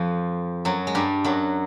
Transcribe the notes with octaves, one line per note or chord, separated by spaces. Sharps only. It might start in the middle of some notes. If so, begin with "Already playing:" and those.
Already playing: F2 F3
F#2 F#3
G#3
G2 G3
F#2 F#3